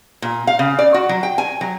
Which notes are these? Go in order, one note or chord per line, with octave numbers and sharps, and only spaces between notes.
A#2
F5
C#3
D5
F#4
F#3
G5
G#5
F#3